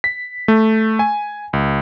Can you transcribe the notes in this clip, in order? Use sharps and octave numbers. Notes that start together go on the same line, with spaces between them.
B6
A3
G#5
C#2